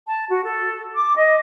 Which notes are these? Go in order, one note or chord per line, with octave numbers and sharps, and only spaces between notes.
A5
F#4
A4
D6
D#5